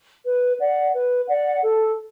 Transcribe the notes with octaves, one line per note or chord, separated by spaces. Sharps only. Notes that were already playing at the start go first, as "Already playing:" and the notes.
B4
D5 F#5
B4
D5 F#5
A4